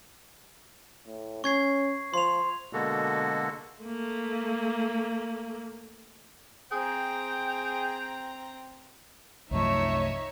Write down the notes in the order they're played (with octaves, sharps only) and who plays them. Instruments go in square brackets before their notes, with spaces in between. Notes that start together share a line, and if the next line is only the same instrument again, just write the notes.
[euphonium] A2
[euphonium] C#4 [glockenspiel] C#6 G#6 C7
[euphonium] F3 [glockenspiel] C6 F7
[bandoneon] B2 D3 G#3 A#3 F#4 A4
[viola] A3 A#3
[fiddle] C4 A#5 [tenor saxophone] G#4 [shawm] G5
[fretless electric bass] C2 F#2 F3 [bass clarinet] A3 [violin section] D#4 C#5 E5